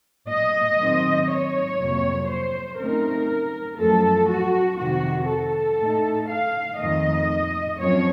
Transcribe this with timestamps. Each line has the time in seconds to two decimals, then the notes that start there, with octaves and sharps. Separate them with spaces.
0.29 D#5
0.78 D#3 F#3 C4
1.28 C#5
1.78 F2 C3 F#3 A#3
2.28 C5
2.78 C#3 A3 C4 D#4 A#4
3.78 F#2 F3 A3 A4
4.28 F#4
4.78 F2 C3 D#3 F#4
5.28 A4
5.78 A2 A3 D#4
6.28 F5
6.78 F2 D#3 A3 D#5
7.78 F#2 F3 C4 C#5